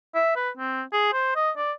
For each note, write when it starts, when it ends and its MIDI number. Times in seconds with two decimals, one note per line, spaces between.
0.15 0.33 76
0.36 0.49 71
0.57 0.82 60
0.93 1.13 68
1.13 1.33 72
1.36 1.51 75
1.57 1.72 74